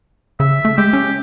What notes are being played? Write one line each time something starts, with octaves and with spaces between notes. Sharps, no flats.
C#3 E5
A3
G#3 G4
C#4